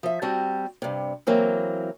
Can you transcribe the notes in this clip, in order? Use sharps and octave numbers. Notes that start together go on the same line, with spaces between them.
F3 E5
G3 C4 F#4 A5
G2 C3
E3 F#3 A#3 C4